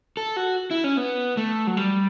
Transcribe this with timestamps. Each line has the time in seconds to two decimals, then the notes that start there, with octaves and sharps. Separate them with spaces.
0.17 A4
0.37 F#4
0.71 E4
0.84 C#4
0.97 B3
1.37 A3
1.67 F#3
1.77 G3